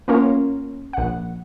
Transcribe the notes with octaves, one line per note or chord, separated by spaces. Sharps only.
A#3 B3 C#4 F4 A#4
A#1 F#5